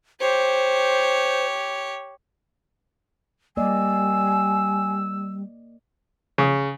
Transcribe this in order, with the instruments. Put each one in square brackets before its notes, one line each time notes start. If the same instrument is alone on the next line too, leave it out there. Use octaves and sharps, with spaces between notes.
[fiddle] G4 C#5 [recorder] C5
[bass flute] G3 [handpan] A#3 D5 D#5 [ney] G#5 [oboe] E6
[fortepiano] C#3